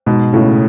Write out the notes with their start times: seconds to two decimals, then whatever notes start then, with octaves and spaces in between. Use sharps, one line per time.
0.06 G#2 B2
0.33 A2 C#3